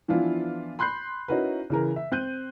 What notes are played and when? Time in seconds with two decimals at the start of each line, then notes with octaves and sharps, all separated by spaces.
0.08 E3 F3 B3 D4 E4 F4
0.79 B5 C6 F#6 G6 C7
1.28 C#4 D#4 E4 F#4 A#4 B4
1.70 C#3 E3 A#4
1.96 E5
2.12 C4 F#6 G6 D#7